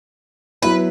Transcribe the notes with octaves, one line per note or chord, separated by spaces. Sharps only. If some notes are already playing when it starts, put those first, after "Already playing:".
F#3 B3 E4 B4